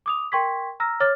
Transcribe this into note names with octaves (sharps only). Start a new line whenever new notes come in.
D6 D#6 F7
A#4 G5 C6 C#6 G#6 B6
A#5 E6 F6 A#6
C#5 D6 F6 A6